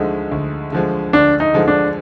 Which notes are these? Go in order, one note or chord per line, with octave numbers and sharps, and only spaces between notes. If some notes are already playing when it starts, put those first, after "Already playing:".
Already playing: D2 D3 F3 G#3 D#4
D2
D3 F3 G#3
D2 D4
D#4
D3 F3 G#3
D4